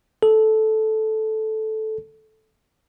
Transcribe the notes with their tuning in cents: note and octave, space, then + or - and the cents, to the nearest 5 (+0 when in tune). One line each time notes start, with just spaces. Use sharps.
A4 -10